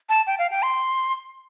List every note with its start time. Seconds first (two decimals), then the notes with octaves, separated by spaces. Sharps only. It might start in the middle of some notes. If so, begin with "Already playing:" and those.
0.09 A5
0.27 G5
0.39 F5
0.51 G5
0.63 C6